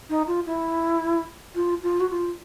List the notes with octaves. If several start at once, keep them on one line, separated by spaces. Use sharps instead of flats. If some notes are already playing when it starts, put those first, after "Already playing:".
D#4
F4
E4
F4
F4
F#4
F4